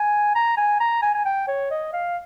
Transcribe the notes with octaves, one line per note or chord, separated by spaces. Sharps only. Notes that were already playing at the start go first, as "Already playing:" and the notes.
Already playing: G#5
A#5
G#5
A#5
G#5
G#5
G5
C#5
D#5
F5